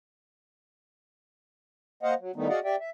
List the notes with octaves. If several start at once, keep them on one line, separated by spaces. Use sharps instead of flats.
A#3 C5 D#5 F5 F#5
F#3
D#3 E3 G3 A3 B3 D#4
F#4 G#4 D5 D#5 F5 F#5
G4 D5 E5 G5
E5